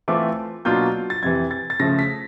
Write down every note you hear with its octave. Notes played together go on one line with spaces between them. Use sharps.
E3 A3 C4 F4 D6
B2 F#3 A#3 D4 F4 G6
A6
F2 C3 E3 G#6
A6
A6
C#3 F3 A3 A#6
B6